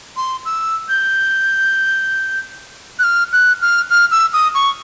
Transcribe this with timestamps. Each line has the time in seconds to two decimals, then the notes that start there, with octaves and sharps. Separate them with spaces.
0.17 C6
0.45 E6
0.89 G6
2.99 F#6
3.04 F6
3.33 F#6
3.62 F6
3.90 F6
4.11 E6
4.33 D#6
4.55 C#6